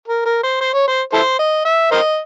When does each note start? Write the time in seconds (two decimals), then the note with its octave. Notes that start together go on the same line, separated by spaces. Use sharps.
0.08 A#4
0.26 A#4
0.43 C5
0.61 C5
0.74 C#5
0.88 C5
1.13 E4 A4 C5
1.39 D#5
1.65 E5
1.92 A#4 C5 D#5